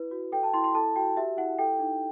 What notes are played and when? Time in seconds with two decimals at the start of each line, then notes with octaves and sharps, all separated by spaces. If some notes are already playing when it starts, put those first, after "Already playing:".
Already playing: E4 B4
0.11 F#4
0.32 A4 G5
0.43 A5
0.54 E4 C6
0.64 C6
0.75 A4 A5
0.95 F#4 G5
1.17 G4 E5
1.37 E4 F#5
1.59 A4 G5
1.79 D#4